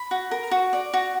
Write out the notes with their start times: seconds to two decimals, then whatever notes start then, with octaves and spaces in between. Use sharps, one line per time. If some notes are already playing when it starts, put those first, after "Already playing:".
Already playing: B5
0.11 F#4
0.31 A#4
0.51 F#4
0.73 D5
0.94 F#4